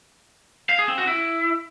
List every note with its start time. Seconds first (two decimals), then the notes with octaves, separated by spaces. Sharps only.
0.69 F5
0.79 G#4
0.88 C4
0.98 F#4
1.07 E4